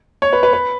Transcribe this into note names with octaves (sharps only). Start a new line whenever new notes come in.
C#5
B4
B4
B4